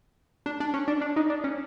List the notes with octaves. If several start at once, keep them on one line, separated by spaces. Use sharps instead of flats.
D4
D4
C#4
D4
D4
D#4
D4
C#4